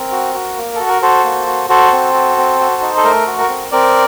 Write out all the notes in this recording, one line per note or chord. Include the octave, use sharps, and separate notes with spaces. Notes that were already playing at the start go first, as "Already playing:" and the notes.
Already playing: C4 A#4
F#4
F#4
A#3
F#4 A4
A#4
F#4 A4 C5
A#3
F#4
F#4 A4 C5
C4
F#4
C4
F#4
D#4
A4
A3 A#4
F#4
A#4
C4
C4 A#4 D5